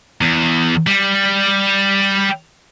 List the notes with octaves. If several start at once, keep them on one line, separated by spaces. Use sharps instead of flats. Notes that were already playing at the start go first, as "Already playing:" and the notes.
E2
G3